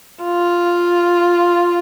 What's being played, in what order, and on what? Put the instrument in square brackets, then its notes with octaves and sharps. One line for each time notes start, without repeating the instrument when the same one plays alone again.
[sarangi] F4